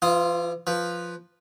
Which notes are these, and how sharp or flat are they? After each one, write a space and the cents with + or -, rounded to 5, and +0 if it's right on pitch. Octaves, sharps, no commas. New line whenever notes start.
E3 +45 F4 +0 D#6 +0
F3 +0 B4 +0